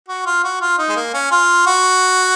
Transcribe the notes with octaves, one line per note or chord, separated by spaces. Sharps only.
F#4
F4
F#4
F4
D#4
G#3
A#3
C#4
F4
F#4